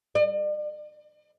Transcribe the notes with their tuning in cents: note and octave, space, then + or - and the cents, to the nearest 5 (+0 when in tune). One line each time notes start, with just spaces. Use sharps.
D5 +45